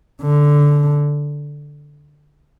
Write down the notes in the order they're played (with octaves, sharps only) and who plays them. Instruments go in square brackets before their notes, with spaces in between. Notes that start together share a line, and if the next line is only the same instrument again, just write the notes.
[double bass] D3